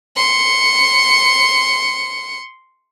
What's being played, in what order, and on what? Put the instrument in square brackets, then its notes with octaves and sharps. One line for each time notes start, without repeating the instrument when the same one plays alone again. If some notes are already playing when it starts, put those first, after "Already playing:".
[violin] C6 C#7